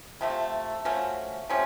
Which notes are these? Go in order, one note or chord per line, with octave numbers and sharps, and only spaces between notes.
C3 F3 A3
F3 A3 C#4 F#4
C3 F3 A3 C#4